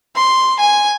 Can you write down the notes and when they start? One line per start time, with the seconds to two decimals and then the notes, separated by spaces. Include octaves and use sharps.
0.16 C6
0.59 G#5